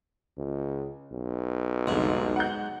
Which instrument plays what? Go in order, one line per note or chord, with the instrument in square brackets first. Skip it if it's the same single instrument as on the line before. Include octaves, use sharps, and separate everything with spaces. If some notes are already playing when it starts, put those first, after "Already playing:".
[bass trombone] C#2
B1
[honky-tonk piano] C2 F2 D3 [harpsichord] G#2
[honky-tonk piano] F#5 A#5 G6